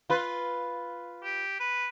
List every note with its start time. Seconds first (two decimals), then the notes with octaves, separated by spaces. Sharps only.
0.10 F4 B4
1.23 G4
1.60 B4